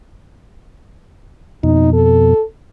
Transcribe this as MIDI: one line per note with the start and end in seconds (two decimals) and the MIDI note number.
1.64 2.34 41
1.64 2.34 47
1.64 1.90 63
1.93 2.43 69